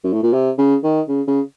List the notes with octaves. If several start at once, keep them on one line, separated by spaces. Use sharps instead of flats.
F#2
A2
A#2
C3
C#3
D#3
C#3
C#3